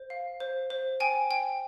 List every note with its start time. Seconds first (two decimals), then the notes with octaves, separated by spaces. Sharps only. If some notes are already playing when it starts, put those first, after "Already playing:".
Already playing: C5
0.10 F5
0.40 C5
0.70 C5
1.00 G5 G#5
1.31 G5